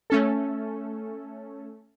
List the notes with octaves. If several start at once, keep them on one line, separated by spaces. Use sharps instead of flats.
A3 C#4 A4